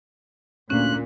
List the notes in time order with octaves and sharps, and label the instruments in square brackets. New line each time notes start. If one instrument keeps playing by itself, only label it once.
[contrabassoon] D2 [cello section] A#2 [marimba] C#4 [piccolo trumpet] F#6